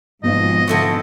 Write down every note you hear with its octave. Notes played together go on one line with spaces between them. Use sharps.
G#1 G#2 B2 F3 D#5
D3 A3 C#4